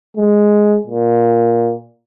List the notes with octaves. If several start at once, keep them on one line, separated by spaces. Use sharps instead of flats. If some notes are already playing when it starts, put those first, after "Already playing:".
G#3
A#2